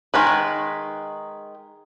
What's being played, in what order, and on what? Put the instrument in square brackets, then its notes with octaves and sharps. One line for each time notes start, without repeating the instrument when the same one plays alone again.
[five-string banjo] D#3 G#3 B4